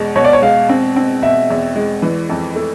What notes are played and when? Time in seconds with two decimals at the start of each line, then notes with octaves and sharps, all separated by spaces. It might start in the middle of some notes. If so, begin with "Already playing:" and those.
Already playing: E2 B2 G#3
0.16 B2 C#5
0.25 D5
0.33 C#5
0.42 G#3 F5
0.69 C4
0.96 C4
1.23 B2 E5
1.50 E2
1.76 G#3
2.02 E3
2.30 F2
2.56 A3